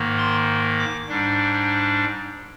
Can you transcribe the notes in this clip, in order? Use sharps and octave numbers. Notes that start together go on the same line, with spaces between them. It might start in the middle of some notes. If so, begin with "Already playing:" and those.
Already playing: G#2 D#3 A#3
C6
D6
G#2 G3 D4